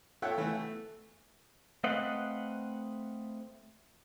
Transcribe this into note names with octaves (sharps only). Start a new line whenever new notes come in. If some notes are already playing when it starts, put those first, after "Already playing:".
F4 A4 C#5 E5 F#5 G5
E3 A3
A3
A3 C4 B4 D#5 F5 F#5